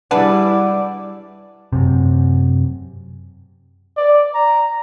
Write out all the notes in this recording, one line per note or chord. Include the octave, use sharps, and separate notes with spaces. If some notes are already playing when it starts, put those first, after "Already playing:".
G3 D4 E4 G#4 B4 D5 F#5
F#2 C3
D5
A#5